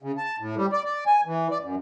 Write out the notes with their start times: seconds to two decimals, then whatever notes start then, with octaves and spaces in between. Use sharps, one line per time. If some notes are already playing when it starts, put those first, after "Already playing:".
0.02 C#3
0.18 A5
0.40 A2
0.56 G3
0.73 D5
0.85 D5
1.06 G#5
1.26 E3
1.51 D5
1.63 F#2